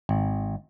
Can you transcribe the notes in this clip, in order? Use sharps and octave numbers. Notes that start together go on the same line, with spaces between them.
G#1